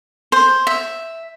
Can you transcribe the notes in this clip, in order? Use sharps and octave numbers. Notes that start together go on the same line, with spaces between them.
C5
E5